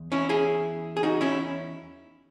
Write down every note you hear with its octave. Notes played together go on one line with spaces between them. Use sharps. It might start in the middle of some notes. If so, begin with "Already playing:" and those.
Already playing: E2
C#4 E4
E4 G#4
G#4
D#4 F#4
C#4 E4